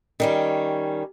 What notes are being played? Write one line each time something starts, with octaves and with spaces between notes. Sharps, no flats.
D#3 G3 C#4